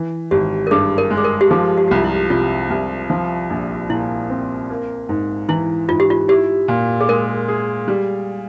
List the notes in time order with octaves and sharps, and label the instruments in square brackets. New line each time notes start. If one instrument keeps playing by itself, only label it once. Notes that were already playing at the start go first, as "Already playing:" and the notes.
Already playing: [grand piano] E3
[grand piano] G#1 [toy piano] G4
[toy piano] A#4
[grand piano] G2 [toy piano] G#4
[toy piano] A#4
[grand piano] G#3
[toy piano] G#4
A#4
G4
[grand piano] F3 [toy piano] G#4
[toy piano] G4
G4
[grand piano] C2
[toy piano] F4
E4
[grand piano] C3 [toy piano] F4
[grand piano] C2
F3
A#1
[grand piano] A#2 [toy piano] E4
[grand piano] C4
A#3
G#2
[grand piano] E3 [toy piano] E4
[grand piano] G#2 [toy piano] F4
[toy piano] G4
F4
[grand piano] E4 [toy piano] G4
[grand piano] A#2
[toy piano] G#4
[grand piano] G#3 [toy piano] A#4
[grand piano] G#4
G3